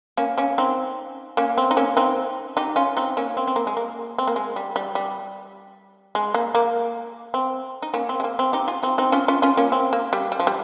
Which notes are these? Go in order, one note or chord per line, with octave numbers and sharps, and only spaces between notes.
A#3 C#4
A#3 C#4
C4 D#4
A#3 C#4
C4
D#4
A#3 C#4
C4 D#4
D#4 G4
C#4 F4
C4 D#4
A#3 C#4
C4
C4
A#3
G#3
A#3
C4
A#3
G#3
G3
G3
G3
G#3
A#3
A#3
C4
D#4
A#3 C#4
C4
G#3
A#3
C4
D#4 G4
F4 G#4
C4 D#4
C4 D#4
C#4 F4
C#4 F4
C#4 F4
A#3 C#4
C4
A#3
G3
G3
F3
G3